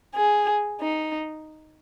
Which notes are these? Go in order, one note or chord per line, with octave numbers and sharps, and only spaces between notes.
G#4
D#4